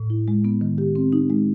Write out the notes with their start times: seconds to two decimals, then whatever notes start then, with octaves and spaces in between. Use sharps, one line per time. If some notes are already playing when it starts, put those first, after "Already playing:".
Already playing: A2
0.10 E4
0.28 G#3
0.45 B3
0.61 D#3
0.78 G4
0.96 C4
1.13 D#4
1.30 G#3